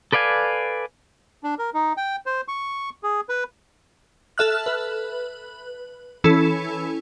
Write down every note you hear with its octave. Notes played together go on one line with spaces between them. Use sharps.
A4 B4 D5 F5 G#5
D4
A#4
D#4
G5
C5
C#6
G#4
B4
A4 E5 F6 F#6
B4
E3 C#4 E4 A4